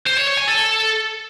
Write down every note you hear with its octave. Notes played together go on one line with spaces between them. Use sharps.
C5
C#5
C#5
G#5
A4